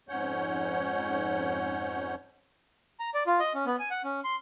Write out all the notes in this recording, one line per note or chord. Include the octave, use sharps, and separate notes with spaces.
F2 G#2 C#4 C#5 F#5 G6
A#5
D5
F4
D#5
C#4
B3
G#5
F#5
C#4
C6